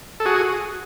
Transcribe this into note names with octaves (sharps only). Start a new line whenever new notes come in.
A4
F#4 G#4